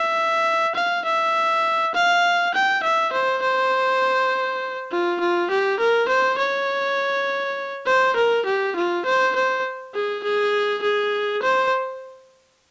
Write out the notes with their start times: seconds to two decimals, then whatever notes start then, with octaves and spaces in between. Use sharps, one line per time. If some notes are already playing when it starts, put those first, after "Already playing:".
Already playing: E5
0.75 F5
1.05 E5
1.95 F5
2.54 G5
2.83 E5
3.13 C5
3.42 C5
4.91 F4
5.21 F4
5.50 G4
5.79 A#4
6.09 C5
6.38 C#5
7.87 C5
8.16 A#4
8.46 G4
8.76 F4
9.05 C5
9.35 C5
9.95 G#4
10.24 G#4
10.83 G#4
11.43 C5